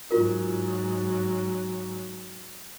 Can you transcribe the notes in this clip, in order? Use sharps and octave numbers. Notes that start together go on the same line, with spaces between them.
G#2 F#3 F4 A#4